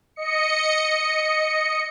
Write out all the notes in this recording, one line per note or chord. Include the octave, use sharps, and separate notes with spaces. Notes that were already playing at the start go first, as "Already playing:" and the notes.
D#5 C#7